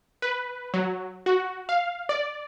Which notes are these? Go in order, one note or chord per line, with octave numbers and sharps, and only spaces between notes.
B4
F#3
F#4
F5
D5